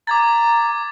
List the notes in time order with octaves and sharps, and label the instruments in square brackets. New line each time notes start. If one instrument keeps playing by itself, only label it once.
[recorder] A#5 [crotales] D6 G#6 A6